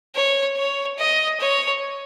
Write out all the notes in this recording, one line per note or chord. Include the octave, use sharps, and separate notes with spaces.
C#5
C#5
D#5
C#5